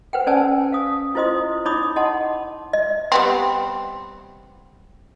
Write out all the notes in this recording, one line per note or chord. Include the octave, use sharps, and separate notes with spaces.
B4 C5 F#5 G5
C#4 C5 D5 G#5 A5 E6
F5 D#6
E4 F4 C5 D#5 C6 D#6
D#4 E4 C#5 B5 D6 D#6
D#5 F#5 A5 C6
D#5
G3 B3 C4